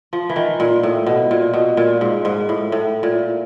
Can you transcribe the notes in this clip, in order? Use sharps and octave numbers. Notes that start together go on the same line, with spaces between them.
F3
E3
D#3
A#2
A2
B2
A#2
B2
A#2
G#2
G#2
A2
A2
A#2